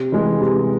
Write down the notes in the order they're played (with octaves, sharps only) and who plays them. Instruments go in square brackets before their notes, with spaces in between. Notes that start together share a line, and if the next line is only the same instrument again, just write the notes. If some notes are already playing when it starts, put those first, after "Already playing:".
Already playing: [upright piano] C3
E3 G#3
C3